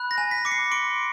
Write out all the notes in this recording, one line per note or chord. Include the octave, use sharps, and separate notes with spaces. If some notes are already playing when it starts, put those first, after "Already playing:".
Already playing: B5 F#6
A#6
G#5
B6
D6 C#7
C7
C6 D7